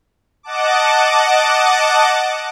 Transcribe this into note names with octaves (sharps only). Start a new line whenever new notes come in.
D#5 F#5 A5 D6